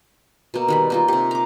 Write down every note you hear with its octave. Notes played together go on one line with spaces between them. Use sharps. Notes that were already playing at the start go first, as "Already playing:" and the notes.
B2 A#3
D#3 G3 B5
A#3 D#4 F4
C3 G4
A#5 D6